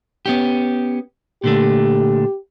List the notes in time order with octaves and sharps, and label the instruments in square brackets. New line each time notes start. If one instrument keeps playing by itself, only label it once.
[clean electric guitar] B3 C#4 G4
[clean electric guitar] A#2 D3 A3 [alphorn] G4